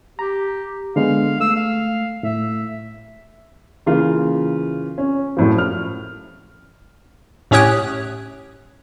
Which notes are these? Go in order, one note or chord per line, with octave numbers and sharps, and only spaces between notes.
G4 A#5
D3 G#3 B3 F5
A3 E6
F5
A2 E5
C#3 E3 A#3 F4
C#4
F#2 A2 F3
F6
A2 C#4 G4 C#5 D#6 F#6